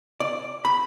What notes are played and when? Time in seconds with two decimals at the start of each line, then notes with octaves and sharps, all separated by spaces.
0.20 D5
0.65 B5